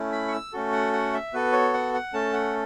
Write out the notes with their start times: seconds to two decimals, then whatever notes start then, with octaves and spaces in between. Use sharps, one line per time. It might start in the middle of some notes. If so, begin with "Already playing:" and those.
Already playing: A3 C#4 E4
0.12 B5
0.28 C#6
0.32 E6
0.53 A3 C#4 F#4 A4
0.72 F#5
0.93 F#5
1.13 E5
1.33 B3 F#4 A4 B4
1.53 C#5
1.74 F#5
1.94 F#5
2.13 A3 C#4 A4 A5
2.33 F#5